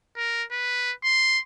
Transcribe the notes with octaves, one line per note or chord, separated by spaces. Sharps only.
A#4
B4
C6